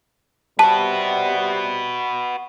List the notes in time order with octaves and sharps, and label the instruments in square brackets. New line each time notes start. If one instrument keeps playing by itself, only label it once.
[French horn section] C3 G3 [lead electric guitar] F#4 B4 [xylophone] A5